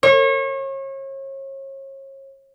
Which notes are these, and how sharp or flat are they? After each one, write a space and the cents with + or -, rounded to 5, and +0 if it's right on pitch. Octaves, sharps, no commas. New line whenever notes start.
C#5 -35